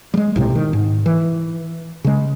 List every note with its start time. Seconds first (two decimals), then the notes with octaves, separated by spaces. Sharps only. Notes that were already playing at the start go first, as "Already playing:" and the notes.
0.14 G3 G#3
0.36 B1 A2 C3
0.55 D#3
0.73 G#2
1.06 E3
2.04 C#3 G#3